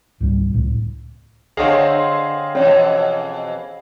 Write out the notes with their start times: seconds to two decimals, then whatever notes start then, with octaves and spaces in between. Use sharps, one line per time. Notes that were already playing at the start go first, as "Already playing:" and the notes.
0.20 C#2 G#2 G3
0.53 C#2 A2
1.57 D3 C4 G#4 C#5 D#5 F5
2.55 F2 B2 E3 C#4 C#5